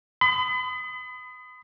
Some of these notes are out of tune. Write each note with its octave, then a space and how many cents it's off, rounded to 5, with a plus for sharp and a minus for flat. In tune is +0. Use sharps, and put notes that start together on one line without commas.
B5 +40 D#6 -5